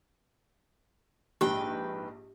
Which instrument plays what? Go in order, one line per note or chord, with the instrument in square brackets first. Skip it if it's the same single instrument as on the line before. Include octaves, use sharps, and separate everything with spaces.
[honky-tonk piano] A#1 G#2 [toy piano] G4 [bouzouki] B4 G5